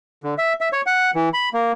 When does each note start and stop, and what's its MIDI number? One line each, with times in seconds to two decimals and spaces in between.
0.24 0.34 50
0.38 0.53 76
0.61 0.69 76
0.73 0.81 73
0.86 1.11 78
1.15 1.29 52
1.33 1.49 83
1.53 1.72 58